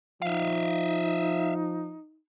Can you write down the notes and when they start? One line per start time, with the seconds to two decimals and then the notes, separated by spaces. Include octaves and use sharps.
0.22 F3 D#4 E5 F5